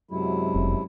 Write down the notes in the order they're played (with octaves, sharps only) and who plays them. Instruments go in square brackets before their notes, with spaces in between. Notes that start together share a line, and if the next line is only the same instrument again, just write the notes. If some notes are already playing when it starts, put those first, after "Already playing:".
[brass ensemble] F#2 F#3 G#3 [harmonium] C3 E4
[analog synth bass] F1